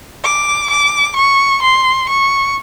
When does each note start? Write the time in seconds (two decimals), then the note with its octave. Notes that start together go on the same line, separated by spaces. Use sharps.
0.24 D6
0.70 D6
1.16 C#6
1.62 C6
2.09 C#6